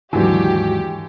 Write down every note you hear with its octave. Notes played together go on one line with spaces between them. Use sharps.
D#2 G#2 D3 E3 F#3 F#4 G4